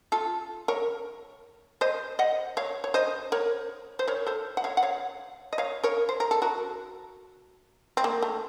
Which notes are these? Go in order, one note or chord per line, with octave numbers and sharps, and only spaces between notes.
F4 A4
A#4 C#5
C5 D#5
D#5 F#5
C#5 F5
C#5
C5 D#5
A#4 C#5
C5
A#4 C#5
A4 C5
F#5
C#5 F5
F#5
C#5 F5
D#5
C#5 F5
A#4 C#5
C5
A#4
A4
F#4 A#4
C4
A#3
A3